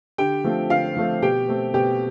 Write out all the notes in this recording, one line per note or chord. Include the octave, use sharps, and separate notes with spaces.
D3 G4 G5
F3 A3 C4
D3 F4 F5
F3 A3 C4
B2 G4 G5
A3 C4
B2 G4 G5